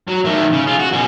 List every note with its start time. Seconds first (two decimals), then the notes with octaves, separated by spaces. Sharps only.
0.08 F#3
0.25 D#3 A3
0.53 C#3
0.67 F4 G#4
0.79 F#4
0.92 B2 C#4